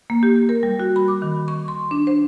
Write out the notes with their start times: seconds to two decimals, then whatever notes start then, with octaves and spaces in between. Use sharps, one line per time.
0.10 A#3
0.23 G4
0.49 A#4
0.63 G3
0.80 F#4
0.96 B5
1.08 D6
1.22 D#3
1.48 C#6
1.68 C6
1.91 D4
2.07 C5